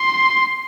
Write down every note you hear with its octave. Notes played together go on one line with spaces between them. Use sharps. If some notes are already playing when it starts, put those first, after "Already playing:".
Already playing: C6